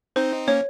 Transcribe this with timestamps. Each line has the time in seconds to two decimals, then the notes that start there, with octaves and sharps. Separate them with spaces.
0.16 C4 D#4 C5
0.48 A#3 C#4 C#5